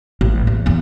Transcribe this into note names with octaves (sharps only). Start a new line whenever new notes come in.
A1
E2
E2 A#3